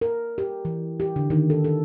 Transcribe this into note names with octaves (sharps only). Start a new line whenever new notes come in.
A#4
G4
E3
G4
D3
D#3
A4
A4